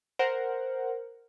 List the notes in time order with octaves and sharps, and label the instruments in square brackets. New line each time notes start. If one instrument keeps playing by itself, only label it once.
[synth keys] A#4 C5 F#5